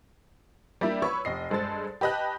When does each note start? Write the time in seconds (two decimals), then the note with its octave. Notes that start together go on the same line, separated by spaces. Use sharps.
0.81 G3 A#3 D4 E4
1.02 B4 C#5 B5 C#6 E6
1.25 F1 D#5 C7
1.50 G2 G#3 A4 C5 A6
2.01 G4 B4 D#5 A5 F#6